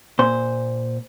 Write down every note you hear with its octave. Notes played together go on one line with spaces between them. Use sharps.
A#2 C5